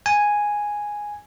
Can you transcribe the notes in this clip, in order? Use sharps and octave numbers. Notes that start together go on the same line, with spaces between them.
G#5